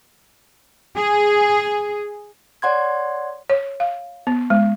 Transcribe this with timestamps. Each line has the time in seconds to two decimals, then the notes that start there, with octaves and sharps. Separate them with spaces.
0.96 G#4
2.62 C#5 D5 F#5 C6 G#6
3.50 C#5
3.80 F5
4.27 B3
4.50 G#3